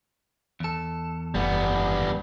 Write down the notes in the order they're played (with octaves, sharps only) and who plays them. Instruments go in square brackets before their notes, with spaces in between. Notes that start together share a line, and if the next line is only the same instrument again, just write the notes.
[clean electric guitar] E2 A4
[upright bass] F#1 [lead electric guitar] G3 B3